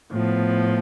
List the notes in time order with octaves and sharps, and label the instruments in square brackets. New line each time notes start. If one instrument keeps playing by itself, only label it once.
[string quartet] A2 F3 B3